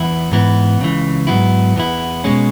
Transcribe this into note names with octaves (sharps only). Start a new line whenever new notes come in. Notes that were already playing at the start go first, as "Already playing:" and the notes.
Already playing: E2 E3 B3 E4
G#2 E3 B3 E4
C#2 C#3 E3
G#2 F#3 B3 E4
E2 E3 B3 E4
B2 G#3 C#4